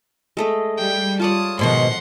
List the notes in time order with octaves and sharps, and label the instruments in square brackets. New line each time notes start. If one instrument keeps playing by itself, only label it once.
[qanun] G#3 A3 D#5
[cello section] G3 [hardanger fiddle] G5
[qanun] F4 C#5 D5 [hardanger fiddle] A5 D#6
[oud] G#2 B2 D#3 [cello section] F3 [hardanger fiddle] F#5 C6